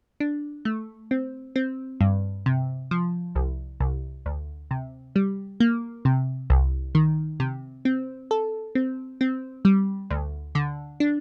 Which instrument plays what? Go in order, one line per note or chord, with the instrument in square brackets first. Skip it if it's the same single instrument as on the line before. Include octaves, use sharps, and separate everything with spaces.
[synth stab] D4
A3
C4
C4
G2
C3
F3
C2
C2
D2
C3
G3
A#3
C3
C2
D#3
C3
C4
A4
C4
C4
G3
D2
D3
D4